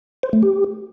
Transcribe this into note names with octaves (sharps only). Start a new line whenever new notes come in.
C5
A3
G4